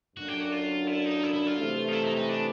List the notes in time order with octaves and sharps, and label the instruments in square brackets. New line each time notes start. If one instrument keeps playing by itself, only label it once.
[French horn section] F#2 D3 F#3 A#3 D4 [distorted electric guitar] F#4
[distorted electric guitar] G4
F#4
F4
E4
D#4
E4
E4
F4
[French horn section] C3 E3 A3
[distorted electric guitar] D#4
E4
D#4
D#4
D4